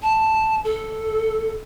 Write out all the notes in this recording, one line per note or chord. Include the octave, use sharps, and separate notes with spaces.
A5
A4